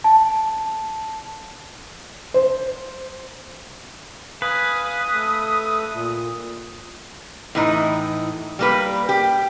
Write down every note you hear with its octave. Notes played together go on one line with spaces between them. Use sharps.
A5
C5
B4 F5 G#5 D#6
A3 A4
A#2
A2 E3 D#4
G3 A#3 B4
G4